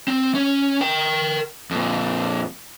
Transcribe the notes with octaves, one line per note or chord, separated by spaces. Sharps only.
C4
C#4
A#4 G5
F2 A#2